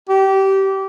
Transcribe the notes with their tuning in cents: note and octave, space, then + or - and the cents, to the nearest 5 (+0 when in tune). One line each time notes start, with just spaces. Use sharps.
G4 -20